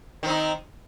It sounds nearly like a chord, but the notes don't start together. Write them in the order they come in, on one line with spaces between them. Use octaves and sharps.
D#3 C4 D#4